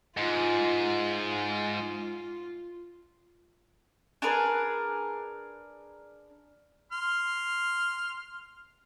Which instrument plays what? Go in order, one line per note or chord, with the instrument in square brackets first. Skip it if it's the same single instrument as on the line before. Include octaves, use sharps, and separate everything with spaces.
[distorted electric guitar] G#2 [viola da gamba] F4
[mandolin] D4 G#4 A#4 B4
[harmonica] C6 F6